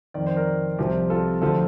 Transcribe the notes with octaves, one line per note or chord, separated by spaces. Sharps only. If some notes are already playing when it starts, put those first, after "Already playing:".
F2 D#3 D5
C5
A#4 D5
C2 C3 F3 G4
F4 A4
D2 D3 F3 F4 A4